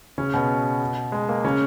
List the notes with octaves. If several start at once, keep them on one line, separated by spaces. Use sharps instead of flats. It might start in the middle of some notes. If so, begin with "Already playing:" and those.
C#3 C#4
B2 B3
G#3
A#3
C#3 C#4